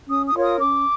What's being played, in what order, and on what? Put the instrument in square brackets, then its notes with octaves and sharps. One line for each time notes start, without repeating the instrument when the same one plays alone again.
[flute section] C#4 D#6
D#6
F4 A#4 C#5
D#6
C#4 D6